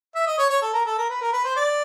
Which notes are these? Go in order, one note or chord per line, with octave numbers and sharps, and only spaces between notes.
E5
D#5
C#5
C#5
A4
A#4
A4
A#4
B4
A#4
B4
C5
D5